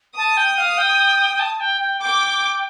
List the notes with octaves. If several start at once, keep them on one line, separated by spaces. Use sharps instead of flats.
A5 D#6
G5
F5
G5
G5
A5
G5
G5
G5 D6